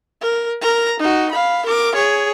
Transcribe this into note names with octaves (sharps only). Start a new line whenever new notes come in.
A#4
A#4 A#5
D#4 F#4
F5 B5
A#4 D6
G#4 C#5